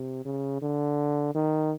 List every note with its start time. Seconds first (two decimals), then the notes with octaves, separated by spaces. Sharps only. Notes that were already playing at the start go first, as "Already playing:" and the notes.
Already playing: C3
0.25 C#3
0.62 D3
1.35 D#3